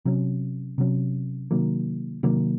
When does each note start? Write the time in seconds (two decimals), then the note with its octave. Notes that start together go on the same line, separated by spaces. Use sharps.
0.05 C3 F#3 C#4
0.78 C3 F#3 C#4
1.51 C3 D#3 F#3 A#3
2.23 C3 D#3 F#3 A#3